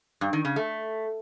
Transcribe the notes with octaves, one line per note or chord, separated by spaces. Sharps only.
G2
D#3
C#3
A3